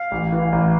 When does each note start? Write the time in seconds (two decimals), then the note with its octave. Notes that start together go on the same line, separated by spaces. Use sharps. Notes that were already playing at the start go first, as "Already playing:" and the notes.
Already playing: F5
0.11 A1
0.32 E3
0.52 A1